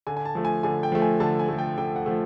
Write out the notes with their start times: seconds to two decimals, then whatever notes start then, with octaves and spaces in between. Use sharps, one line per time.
0.07 D3 G#5
0.17 G#5
0.25 A5
0.35 F3 A3
0.45 G#5
0.63 D3 G#5
0.83 G5
0.92 F3 A3
1.02 G#5
1.20 D3 A5
1.39 G#5
1.49 F3 A3
1.58 G5
1.78 D3 G5
1.96 F#5
2.06 F3 A3